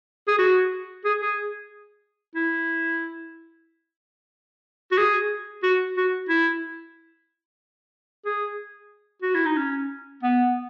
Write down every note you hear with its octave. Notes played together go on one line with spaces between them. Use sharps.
G#4
F#4
G#4
G#4
E4
F#4
G#4
F#4
F#4
E4
G#4
F#4
E4
D#4
C#4
B3